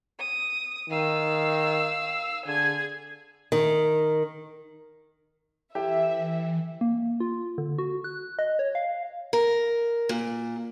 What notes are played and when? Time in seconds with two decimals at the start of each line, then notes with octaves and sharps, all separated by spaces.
0.19 D#6
0.90 D#3 F5 E6
2.46 D3 G#4 G#6
3.52 D#3
5.75 E3 E4 G4 A4 E5
6.81 A#3
7.20 F4
7.58 D3
7.79 F#4
8.04 F#6
8.39 D#5
8.59 C#5
8.75 F5
9.33 A#4
10.09 A#2